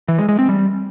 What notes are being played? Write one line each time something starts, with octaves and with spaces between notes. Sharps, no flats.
E3
G#3
G#3
C4
G3